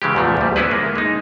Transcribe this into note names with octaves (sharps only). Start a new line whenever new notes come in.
C#3 E3 G#3 G4
E2 A#2 F3 A3
D2 G3
B3 C#4 E4 G#4 B4
G#3 A#3
G#3 D#4